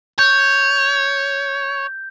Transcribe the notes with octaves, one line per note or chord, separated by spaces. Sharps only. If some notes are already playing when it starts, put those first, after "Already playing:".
C#5 G6